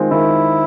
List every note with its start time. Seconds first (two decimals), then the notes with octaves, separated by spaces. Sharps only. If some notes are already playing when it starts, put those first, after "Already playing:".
Already playing: D#3 G#3 C4 F4
0.11 D#3 E4